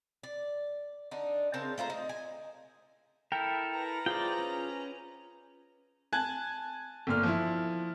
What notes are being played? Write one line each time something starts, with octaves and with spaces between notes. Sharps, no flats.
D5
D3 D4 D#4
C#3 C4 A#4 A5
A3 F4 C5 A#5
D#4
G#5
E4 A4 A#4 G5
B4 A#5
F4 G#4 C5 D5 G5
C#4
G#5 A5 F#6 G#6
G1 A#2 F6
F3 E4